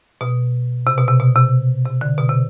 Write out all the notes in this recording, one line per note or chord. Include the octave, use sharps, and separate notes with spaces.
B2
C3
B2
C3
B2
C3
C3
D3
B2
C3